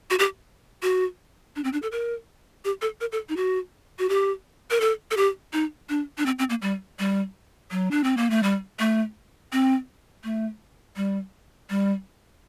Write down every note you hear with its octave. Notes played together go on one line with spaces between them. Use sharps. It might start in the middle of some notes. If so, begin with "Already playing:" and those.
F#4
G4
F#4
D4
C4
D4
A4
A#4
G4
A4
A#4
A4
D#4
F#4
F#4
G4
A#4
A4
A4
G4
D#4
D4
D4
C4
C4
A#3
G3
G3
F#3
D4
C4
A#3
A3
G3
A3
C4
A3
G3
G3